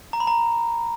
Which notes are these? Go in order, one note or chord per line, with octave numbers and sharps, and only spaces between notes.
A#5
B5
A#5